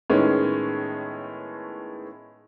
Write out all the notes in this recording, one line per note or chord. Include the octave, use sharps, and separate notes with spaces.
A2 D#3 G#3 B3 C#4